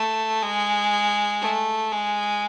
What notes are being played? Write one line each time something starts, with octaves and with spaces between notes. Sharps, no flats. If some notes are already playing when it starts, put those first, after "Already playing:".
Already playing: A3
G#3
A3
G#3